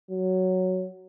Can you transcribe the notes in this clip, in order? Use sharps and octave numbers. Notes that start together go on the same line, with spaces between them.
F#3